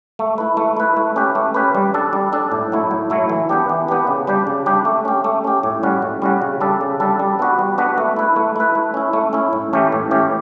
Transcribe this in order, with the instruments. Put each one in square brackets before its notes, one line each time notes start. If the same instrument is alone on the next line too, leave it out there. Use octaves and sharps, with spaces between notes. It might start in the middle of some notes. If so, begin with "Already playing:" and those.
[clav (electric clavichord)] A3
E4 B4
A3
E4 B4
A3
C#4 G4 B4
A3
C#4 G4 B4
G3
D4 A4
G3
D4 A4
A2
F#3 A3 E4
A2
F#3 A3 E4
E3
B3 D4 G4
E3
B3 D4 G4
C#3
G3 D4 G4
C#3
G3 D4 G4
A3
C#4 G4
A3
C#4 G4
A2
G3 C#4 F#4
A2
G3 C#4 F#4
C#3
G3 D4 A4
C#3
G3 D4 A4
G3
B3 D4 F#4 B4
G3
B3 D4 F#4 B4
A3
E4 B4
A3
E4 B4
A3
C#4 E4
A3
C#4 E4
A2
E3 A3 C#4 G4
A2
E3 A3 C#4 G4